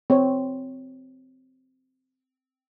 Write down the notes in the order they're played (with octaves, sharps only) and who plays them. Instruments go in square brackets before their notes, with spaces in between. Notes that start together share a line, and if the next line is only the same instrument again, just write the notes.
[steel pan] C4 C#5